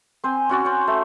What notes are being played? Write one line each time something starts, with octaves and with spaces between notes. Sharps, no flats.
C4 C5 G#5
C#4 F#4 D5
C#4 C5
A3